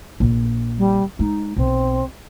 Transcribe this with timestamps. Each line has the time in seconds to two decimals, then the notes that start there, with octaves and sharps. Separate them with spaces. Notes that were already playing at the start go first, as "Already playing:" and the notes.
0.20 A#1 F4
0.78 G3
1.19 G#3 D#4
1.57 B1 C4